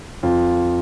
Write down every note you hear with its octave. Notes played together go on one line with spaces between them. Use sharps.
F2 F4